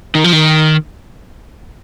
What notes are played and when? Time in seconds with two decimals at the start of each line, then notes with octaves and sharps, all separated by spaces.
0.15 D#3
0.24 F3
0.33 D#3